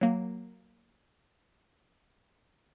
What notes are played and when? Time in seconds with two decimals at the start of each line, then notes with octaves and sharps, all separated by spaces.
0.01 F#3 A#3